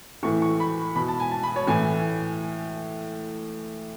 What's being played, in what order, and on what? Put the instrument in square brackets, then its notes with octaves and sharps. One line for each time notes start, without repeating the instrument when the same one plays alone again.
[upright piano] A2 E3 C#6
C#6
B5
B2 B5
A5
G#5
A5
B5
C#5
A2 E3 G#5